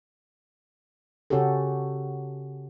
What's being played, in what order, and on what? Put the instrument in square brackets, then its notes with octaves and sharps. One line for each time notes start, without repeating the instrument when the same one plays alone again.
[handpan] C#3 C#4 F#4 G4 A4